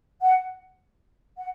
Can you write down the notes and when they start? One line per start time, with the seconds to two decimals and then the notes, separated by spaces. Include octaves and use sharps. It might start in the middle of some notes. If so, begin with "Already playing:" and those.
0.22 F#5
1.36 F#5